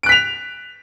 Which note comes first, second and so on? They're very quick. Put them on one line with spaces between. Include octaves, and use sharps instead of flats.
D7 F#6 B6 F7